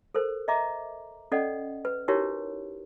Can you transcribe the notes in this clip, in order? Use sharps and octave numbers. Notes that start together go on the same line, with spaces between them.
A4 A#4 C5
D#5 E5 A#5 D6
C#4 A4 D5 D#5 F#5
B4
D#4 E4 F#4 G4 A#4 C#5